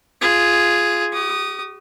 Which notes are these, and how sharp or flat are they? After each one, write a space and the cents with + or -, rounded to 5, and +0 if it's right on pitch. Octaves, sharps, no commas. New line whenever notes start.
F4 -5 G#4 +0
G4 -45 D#6 -10